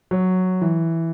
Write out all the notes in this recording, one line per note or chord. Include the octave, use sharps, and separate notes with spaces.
F#3
E3